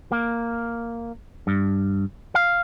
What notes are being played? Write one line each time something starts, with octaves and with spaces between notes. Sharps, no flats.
A#3
G2
F5